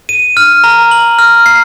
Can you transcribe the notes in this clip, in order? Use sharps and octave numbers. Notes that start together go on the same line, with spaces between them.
D#7
F6
A#5
F#7
F6
C7